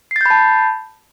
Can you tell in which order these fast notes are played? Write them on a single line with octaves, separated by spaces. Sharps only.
C7 A6 G6 B5 A5